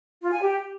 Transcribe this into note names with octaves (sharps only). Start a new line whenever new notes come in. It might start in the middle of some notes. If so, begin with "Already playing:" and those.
F4
G#5
G4